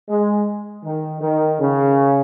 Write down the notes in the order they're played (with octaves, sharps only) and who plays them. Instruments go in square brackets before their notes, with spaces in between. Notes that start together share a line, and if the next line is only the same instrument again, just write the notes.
[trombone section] G#3
D#3
D#3
C#3